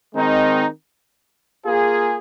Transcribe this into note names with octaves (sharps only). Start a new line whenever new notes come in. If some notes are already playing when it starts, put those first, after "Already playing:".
D#3 G#3 C4 D#4
A#3 F4 G#4